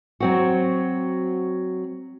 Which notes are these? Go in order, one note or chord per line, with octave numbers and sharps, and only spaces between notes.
F#3 C4 F#4